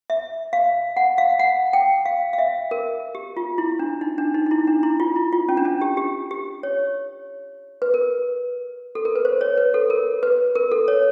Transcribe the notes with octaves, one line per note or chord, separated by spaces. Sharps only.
E5
F5
F#5
F5
F#5
G5
F5
F5
E5
A#4
G4
F4
E4
D4
D#4
D4
D#4
D#4
E4
D4
E4
F4
E4
F4
C#4
D4
C#4
G4
G4
G4
C#5
B4
A#4
A4
A#4
B4
C5
C#5
B4
A4
A#4
B4
A#4
A4
C#5